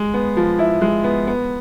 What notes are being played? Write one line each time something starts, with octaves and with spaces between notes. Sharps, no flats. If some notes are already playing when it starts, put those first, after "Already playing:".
Already playing: G#3
B3
F3
E4
G#3
B3
B3